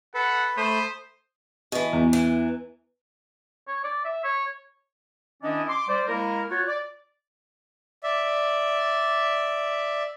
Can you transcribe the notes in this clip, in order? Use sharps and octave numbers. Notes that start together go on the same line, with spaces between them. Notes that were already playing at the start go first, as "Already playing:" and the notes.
A4 B4 F#5
A3 C5 B5 D#6
B2 E3
E2
E3
C#5
D5
E5
C#5
D#3 C#4 D4 E4 D5 D#5
C6 D6
G3 C5 D5
G#3 A#3 E4 A#4
F4 F#4 C#5
D5
D5 E5